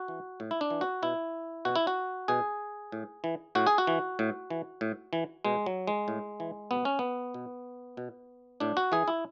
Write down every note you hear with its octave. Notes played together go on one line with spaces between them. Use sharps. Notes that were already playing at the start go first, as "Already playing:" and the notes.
Already playing: F#4
E3
A2
E4
D4
E3
F#4
B2 E4
B2 F#4
E4
F#4
B2 G#4
A2
E3
A2 F#4
G#4
F#4
E3
A2
E3
A2
E3
B2 G#3
F#3
G#3
A2
E3
B2 B3
C#4
B3
B2
B2
A2 D4
F#4
E3 G#4
E4